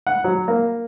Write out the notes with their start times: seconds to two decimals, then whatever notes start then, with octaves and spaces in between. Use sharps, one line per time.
0.07 F#5
0.24 F#3
0.48 A#3